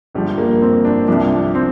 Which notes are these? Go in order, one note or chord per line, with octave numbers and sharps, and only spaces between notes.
G1 G2 F3 G3
A#3
C4
D4
C2 C3 F3 D4
C4